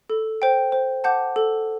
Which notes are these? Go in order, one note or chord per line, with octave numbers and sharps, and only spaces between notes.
A4
C5 G5
C5
F#5 A5 D6 G6
A4